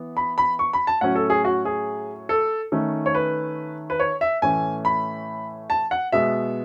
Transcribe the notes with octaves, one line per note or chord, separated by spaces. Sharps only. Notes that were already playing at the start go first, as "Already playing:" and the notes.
Already playing: E3 B3
B5
B5
C#6
B5
A5
A2 F#3 C#4 F#5
A4
G#4
F#4
G#4
A4
D#3 A3 C#4
C#5
B4
B4
C#5
E5
A2 E3 A3 C#4 G#5
B5
A5
F#5
B2 G#3 B3 E5